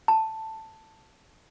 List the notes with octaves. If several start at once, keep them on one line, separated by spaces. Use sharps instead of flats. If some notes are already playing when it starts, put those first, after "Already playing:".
A5